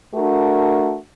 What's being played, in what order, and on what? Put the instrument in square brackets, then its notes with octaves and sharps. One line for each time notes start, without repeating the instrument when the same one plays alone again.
[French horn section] A3 D4 F#4 A#4